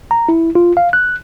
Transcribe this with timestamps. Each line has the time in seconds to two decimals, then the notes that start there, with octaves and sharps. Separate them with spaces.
0.11 A#5
0.29 E4
0.55 F4
0.77 F5
0.93 F#6